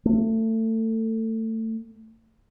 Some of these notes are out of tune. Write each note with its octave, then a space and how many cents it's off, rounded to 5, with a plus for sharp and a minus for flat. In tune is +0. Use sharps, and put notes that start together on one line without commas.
A3 +25